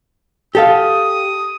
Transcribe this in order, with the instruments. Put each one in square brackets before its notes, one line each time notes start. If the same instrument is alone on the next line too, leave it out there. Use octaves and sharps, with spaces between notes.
[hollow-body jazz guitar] G4 A4 F5 [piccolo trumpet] D#6